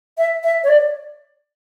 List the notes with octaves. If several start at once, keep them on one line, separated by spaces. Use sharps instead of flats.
E5
E5
C#5
D5